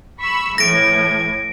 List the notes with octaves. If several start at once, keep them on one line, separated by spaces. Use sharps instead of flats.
B5 C#6 E6
A2 E3 G#6 A#6 D7